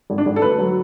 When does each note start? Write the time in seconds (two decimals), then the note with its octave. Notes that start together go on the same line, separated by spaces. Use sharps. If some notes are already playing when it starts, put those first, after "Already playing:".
0.10 G#1
0.18 D4
0.26 G#1
0.36 A4
0.42 D2 B4
0.58 F#3